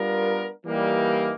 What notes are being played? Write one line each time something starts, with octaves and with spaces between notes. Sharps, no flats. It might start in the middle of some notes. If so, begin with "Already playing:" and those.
Already playing: G3 B3 D4 F4 A#4
E3 G3 A#3 D#4